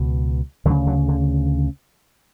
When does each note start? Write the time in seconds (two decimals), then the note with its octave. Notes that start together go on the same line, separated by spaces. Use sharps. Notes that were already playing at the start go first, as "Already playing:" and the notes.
Already playing: C#2 B2
0.65 D2 D3 F#3
0.70 C#3
0.87 D3 F#3
1.09 D3